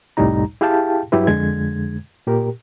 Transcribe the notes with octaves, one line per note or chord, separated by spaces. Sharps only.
C2 F2 A2 G3 D#4 A#5
E4 G4 G#4 F5 G5 A5
G2 F#3 E4 G4 B4
F2 D3 G#3 G#6
A#2 G4 A#4